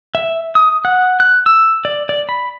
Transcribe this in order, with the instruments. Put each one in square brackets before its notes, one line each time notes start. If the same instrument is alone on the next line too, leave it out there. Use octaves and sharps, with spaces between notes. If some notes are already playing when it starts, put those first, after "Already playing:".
[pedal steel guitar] E5
D#6
F#5
F#6
E6
D5
D5
B5